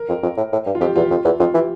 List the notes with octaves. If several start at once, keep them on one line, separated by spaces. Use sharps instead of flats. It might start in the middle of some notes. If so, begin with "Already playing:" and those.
Already playing: A#4
F2
F2
A2
A2
G2
F4
F2 G4
E2 F4
F2
E2
F2 F4
E3 G4